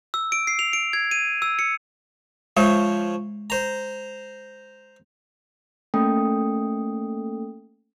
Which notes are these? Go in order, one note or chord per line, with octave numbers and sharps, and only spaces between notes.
E6
D7
C7
F7
D7
G#6
D#7
E6
C#7
F3 G#3 C5 C#5
C5 A#5
A3 A#3 C#4 A4 G5 D#6